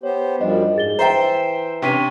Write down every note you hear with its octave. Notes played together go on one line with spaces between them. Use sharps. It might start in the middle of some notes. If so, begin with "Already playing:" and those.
B3 G4 C5 C#5
F#2 F3 G3 D4 D#5
G#2 G#4 A6 G7
E3 C5 E5 G5 A#5 C7
C3 C#4 D4 G4 B6 D#7